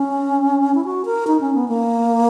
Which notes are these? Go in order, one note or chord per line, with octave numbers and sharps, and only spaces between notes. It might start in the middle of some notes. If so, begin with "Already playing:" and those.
Already playing: C#4
E4
F#4
A#4
D#4
C#4
B3
A#3